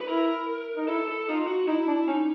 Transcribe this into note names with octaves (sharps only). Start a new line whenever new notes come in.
B4
E4 A#4
D#4
E4 A4
A4
D#4 F4
F#4
D#4 E4
D4
C#4 D#4